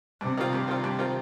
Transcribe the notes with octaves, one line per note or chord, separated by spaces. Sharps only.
G2 C3
D#3 G3 C4 F4
G2
D#3 G3 C4 F4
G2
D#3 G3 C4 F4